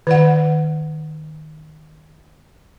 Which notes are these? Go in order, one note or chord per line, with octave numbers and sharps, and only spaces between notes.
D#3 D5 F#5